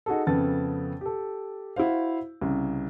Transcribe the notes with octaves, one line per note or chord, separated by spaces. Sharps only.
D#4 F#4 G#4 A4
F2 C#3 B3 A4 A6
G4 A4
E4 F#4 C5 F5
C2 C#3